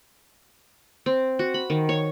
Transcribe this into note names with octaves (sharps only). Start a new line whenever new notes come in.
C4
F#4
B5
D#3
C#5